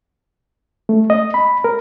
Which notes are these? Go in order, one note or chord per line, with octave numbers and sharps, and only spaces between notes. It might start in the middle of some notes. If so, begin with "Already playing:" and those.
A3
D#5
B5
A#4